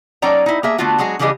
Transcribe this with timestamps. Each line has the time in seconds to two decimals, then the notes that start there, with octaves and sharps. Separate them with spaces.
0.22 F#3 C#4 D#4 D5 G5 A#5
0.46 D#4 E4
0.63 A#3 G#4 E5
0.78 D3 A3 B3 F4 F#4
0.98 F#3 G#3 F#4 G#4
1.19 C#3 E3 G3 G4 G#4 D#5